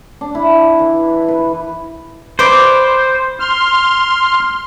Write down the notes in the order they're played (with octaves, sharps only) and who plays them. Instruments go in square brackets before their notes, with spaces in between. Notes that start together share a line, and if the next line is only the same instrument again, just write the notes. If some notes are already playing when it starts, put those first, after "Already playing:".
[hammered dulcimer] D4
E4
E3
B4
[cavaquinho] B4 D5 D6 [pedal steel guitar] C5
[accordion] C6 F6